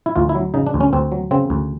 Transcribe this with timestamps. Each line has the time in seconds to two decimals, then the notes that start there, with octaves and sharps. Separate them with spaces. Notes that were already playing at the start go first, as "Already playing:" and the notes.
0.06 E4
0.16 D2 F4
0.29 E4
0.35 F#3
0.54 C#3 D#4
0.67 D4
0.74 D2
0.81 C#4
0.93 D2 C4
1.12 F#3
1.31 C#3 C4
1.50 D2